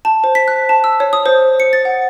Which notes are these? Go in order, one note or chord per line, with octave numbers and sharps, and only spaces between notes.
A5
C5
B6
F#6
A5
E6
C#5
D#6
C5
C#7
A6
F#5